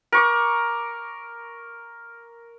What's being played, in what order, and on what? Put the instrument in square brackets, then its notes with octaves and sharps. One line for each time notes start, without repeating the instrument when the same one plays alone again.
[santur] A#4 C#6 D6